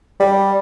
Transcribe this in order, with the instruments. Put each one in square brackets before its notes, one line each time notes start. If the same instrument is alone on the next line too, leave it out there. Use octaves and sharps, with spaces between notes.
[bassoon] G3